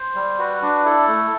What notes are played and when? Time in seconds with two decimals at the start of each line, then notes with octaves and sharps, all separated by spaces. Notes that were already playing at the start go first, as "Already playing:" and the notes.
Already playing: C5
0.15 G3
0.39 F#4 B4
0.62 D4
0.84 E4 A4
1.08 A3